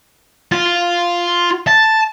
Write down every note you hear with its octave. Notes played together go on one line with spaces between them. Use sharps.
F4
A5